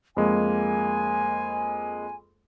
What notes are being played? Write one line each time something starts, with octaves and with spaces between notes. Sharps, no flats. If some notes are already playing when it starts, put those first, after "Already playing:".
F2 G#3 A#3 G#5